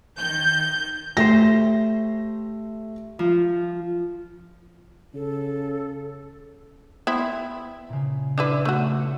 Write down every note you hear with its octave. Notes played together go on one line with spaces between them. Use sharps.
D#3 G6
A3 G4 C5 A#6
F3
C#3 A4
B3 C4 E4
A#2 C#3
D4 E4 B4
A3 B3 D#4 E4 F#4
E6 C#7